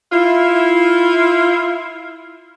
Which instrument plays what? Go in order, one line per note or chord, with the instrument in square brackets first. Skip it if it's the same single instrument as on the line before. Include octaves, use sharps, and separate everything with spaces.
[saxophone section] E4 F4